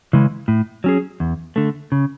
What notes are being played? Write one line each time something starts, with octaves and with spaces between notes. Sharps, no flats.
C#3 E3 G#3
A2
F#3 C#4 G#4
E2
D3 A3
C#3